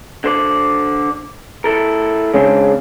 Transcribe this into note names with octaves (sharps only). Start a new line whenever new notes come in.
D3 C5 D5
E4 A4 A#4
C#3 G#3 C4 D4